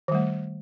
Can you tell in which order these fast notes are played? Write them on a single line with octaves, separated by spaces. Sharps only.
D#3 G3 A3